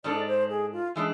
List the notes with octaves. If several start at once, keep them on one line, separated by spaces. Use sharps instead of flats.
G#2 G#3 D4 A4 D5
C5
G#4
F4
E3 G#3 D4